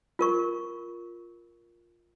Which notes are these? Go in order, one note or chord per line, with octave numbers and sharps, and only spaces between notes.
F4 A#4 C#6